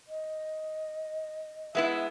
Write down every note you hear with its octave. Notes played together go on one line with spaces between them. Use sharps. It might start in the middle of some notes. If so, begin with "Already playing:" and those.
D#5
G#3 B3 E4 E5